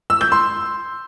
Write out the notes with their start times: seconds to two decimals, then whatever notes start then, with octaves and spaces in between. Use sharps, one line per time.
0.10 E6
0.21 G6
0.32 C6